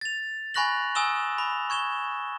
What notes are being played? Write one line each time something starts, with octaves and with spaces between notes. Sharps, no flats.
A6 F7
G#5 B5 C#6 F#6 A#6 F#7
G#5 D#6 E6 E7 G7
B5
C#6 G#6 E7 G7